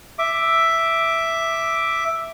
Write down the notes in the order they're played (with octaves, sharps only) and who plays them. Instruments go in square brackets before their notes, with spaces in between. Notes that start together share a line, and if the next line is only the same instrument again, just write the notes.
[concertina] E5 D6